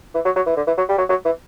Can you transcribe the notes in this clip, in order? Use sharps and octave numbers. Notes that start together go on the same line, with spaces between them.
E3
F#3
F#3
E3
D3
E3
F#3
G3
F#3
F#3
E3